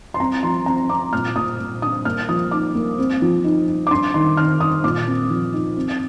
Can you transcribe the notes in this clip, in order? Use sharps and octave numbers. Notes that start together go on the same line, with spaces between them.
C6
C4 A#5
F3 C6
C4 A#5
C4 D6
A#2 F6
A#2 D#6
A#2
D4 D#6
A#3 F6
F3 D#6
D#4 D6
A#3
C4
F3
D#4
D#4
D6
D4 C6
D#3 C6
D#3 F6
D#3 D#6
A#2 D6
C4
F3
D#4
C4